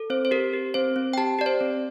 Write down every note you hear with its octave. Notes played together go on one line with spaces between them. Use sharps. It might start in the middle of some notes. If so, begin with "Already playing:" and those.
Already playing: A4
C4 C5
C5
G4 A#4
G4
C4 C5
C4
G5
G4 A5
G4 D5
C5
C4